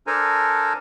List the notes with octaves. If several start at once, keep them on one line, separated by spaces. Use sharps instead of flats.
D4 A4 A#4 C5 G#5 A#5